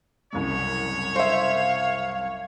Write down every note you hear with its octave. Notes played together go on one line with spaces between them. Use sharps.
F#1 C2 F#2 C#5
C5 E5 F5